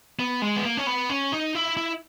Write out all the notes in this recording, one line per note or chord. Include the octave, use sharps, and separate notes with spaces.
B3
G#3
B3
A#3
C#4
B3
C#4
D#4
E4
E4